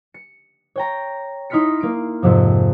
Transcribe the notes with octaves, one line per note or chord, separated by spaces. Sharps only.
C#7
C#5 G5 A#5
D#4 E4 C6 F6 B6 C#7
A#3 D7
F2 G#2 C3 F3